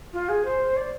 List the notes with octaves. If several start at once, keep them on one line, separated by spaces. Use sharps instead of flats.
F4
G#4
C5
D5